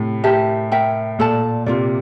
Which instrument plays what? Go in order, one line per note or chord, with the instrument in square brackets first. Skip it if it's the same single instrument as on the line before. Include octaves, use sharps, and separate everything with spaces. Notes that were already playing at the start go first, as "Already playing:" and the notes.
Already playing: [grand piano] A2 C3
[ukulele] G4 A#4 E5 A5
A#4 E5 G5
[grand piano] A#2 [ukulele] A4 D5 A5
[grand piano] C3 [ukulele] F4 A#4 D5